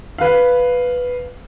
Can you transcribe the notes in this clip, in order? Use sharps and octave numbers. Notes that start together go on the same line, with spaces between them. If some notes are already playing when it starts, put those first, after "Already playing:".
B4 F5